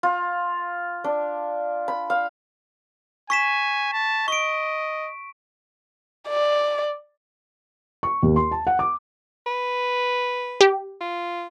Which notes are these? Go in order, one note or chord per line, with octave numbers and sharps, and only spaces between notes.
F4
D4
B5
F5
G#5 C#6 B6 E7
A5
D#5 C#6 D7
D5
C#6
D#2
C6
A5
F#5
D6
B4
G4
F4